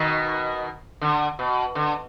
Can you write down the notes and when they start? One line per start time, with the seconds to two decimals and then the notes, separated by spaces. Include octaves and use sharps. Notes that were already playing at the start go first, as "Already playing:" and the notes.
Already playing: B2 D#3
1.01 D3
1.39 B2
1.75 D3